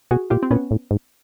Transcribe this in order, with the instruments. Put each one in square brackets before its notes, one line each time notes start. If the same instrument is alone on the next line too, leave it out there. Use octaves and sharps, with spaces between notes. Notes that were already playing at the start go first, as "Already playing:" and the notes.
[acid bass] B2 [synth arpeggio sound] F#4 G#4
[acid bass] A#2 [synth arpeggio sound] F4 G4
[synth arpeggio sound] C4
[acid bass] A#2 [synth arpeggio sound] B3 C#4
[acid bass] A2
G#2